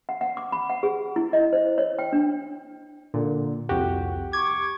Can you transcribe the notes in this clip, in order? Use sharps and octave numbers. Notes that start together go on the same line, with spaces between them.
F#5
F#5
D6
B5
F#5
G#4
E4
D#5
C5
C#5
G5
D4
A#2 D3
C2 F2 F#4 G4
C#6 D6 G#6